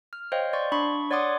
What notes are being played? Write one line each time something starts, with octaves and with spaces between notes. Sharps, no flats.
F6
C5 C#5 D#5 F5 G5
D5 C6 C#6
D4 B5 C#6
C#5 D5 F#5 C6 D6 D#6